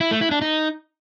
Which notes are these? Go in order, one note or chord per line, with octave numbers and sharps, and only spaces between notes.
E4
A3
E4
D4
D#4